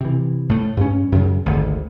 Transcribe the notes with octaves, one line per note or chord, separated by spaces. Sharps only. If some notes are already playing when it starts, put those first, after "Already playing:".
C3 E3
A2 A3
G2 C#4
F#2 C#3
G#1 D2